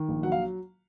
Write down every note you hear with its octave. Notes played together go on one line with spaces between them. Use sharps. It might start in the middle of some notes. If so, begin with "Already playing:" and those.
Already playing: D#3
A#1
F#3 F#5
F5